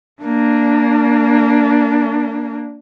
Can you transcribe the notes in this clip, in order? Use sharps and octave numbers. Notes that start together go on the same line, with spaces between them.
A#3 D4